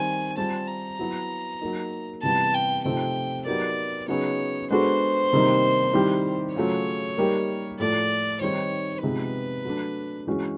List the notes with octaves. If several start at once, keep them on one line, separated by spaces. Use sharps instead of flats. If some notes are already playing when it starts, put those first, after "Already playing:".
Already playing: D#3 G3 C4 G#5
G3 C4 F4 A5
A#5
F#3 B3 E4
F#3 A#3 D#4
C3 E3 G3 B3 A5
G5
C3 F3 A3 C4 D#4 G5
F#3 B3 D#4 G4 A#4 D5
C#3 F#3 B3 D#4 G#4 C#5
G#3 B3 D4 F#4 A4 C5
C3 D#3 G3 A#3 D#4
D#3 G3 C4 E4 G4
C#3 F#3 A3 C#4 F4 C#5
G3 A#3 D#4 G4 A#4
A2 F3 A3 D5
D#3 G3 C4 D#4 C#5
C3 F3 G#3 B3 D#4 B4
F#3 A3 D4
E3 G#3 C#4 F#4